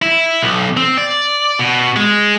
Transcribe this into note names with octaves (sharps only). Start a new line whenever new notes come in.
E4
B1
C4
D5
B2
G#3